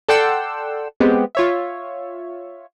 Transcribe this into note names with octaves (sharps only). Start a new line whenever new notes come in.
A4 D5 F#5 G5 C6 E6
G#3 B3 C4 G4
F4 C#5 E5